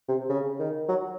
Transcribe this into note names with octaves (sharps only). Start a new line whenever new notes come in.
C3
C#3
D#3
F#3